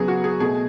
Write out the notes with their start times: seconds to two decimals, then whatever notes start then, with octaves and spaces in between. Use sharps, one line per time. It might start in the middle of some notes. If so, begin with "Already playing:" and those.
Already playing: C#3 F#3 B3 G#4
0.08 F#4
0.24 G#4
0.40 B2 A3 G#4